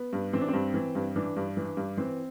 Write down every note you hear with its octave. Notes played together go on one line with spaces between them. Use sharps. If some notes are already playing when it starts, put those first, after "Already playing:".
Already playing: B3
G2
E3 C4
D4
G2 C4
E3
G2
E3 D4
G2
E3
G2
E3 C4